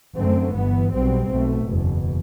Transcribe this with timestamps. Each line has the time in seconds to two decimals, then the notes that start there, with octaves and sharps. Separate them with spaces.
0.17 F#2 D3 A3 C4
0.55 G1 G2 E3 B3
0.93 B1 B2 G3 C4
1.31 B1 B2 A3
1.68 F#1 E2 B2